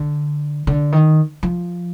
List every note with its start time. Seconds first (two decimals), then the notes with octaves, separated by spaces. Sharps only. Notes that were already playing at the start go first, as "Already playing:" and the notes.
Already playing: D3
0.67 D3
0.92 D#3
1.43 F3